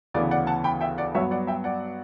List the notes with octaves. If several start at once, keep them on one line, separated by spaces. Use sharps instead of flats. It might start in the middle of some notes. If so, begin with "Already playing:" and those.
D2 C#3 E3 B3 D5
D5 F#5
F#5 A5
G5 B5
E5 G5
D5 F#5
G2 F#3 B3 C#5 E5
D5 F#5
E5 G5
D5 F#5